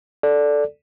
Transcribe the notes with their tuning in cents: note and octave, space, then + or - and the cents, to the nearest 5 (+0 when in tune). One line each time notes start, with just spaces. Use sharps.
A4 +0 D5 -5